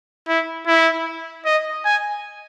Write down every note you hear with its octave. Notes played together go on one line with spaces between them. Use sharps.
E4
E4
D#5
G#5